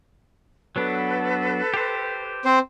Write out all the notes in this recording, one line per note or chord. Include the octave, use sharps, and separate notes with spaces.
F#3 B3 D4 A4 B4
G4 C5
C4 C5